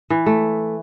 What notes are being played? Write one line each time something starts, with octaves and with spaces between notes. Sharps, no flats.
E3
A3